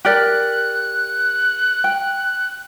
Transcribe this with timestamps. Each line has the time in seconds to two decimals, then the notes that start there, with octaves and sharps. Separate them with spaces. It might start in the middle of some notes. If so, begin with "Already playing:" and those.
0.05 G4 A#4 D5 F#6
1.84 G5